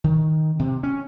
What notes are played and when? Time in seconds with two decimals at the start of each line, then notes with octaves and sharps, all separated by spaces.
0.04 D#3
0.59 C3
0.83 C#4